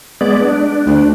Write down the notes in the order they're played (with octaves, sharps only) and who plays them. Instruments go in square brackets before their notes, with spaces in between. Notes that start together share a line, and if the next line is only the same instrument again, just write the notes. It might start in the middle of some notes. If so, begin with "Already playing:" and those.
[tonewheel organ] G#3 B3 D5
D4
[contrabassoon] D2